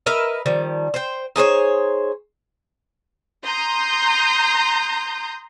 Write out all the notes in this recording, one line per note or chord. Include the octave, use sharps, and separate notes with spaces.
A#4 B4 D#5 E5
D#3 F3 G3
C5 G5
D#4 G#4 C5 C#5
A#5 C6 D#6 G6